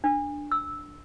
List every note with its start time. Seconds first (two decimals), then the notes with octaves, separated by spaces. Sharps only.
0.04 D4
0.52 E6